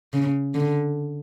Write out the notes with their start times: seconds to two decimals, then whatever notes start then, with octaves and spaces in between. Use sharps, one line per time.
0.13 C#3
0.54 D3